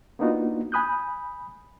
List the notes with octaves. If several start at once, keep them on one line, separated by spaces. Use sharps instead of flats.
A#3 B3 D4 D#4 F4 F#4
G#5 B5 D#6 F#6 G6